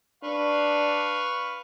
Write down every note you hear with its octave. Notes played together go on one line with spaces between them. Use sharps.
D4 B4 F5 C#6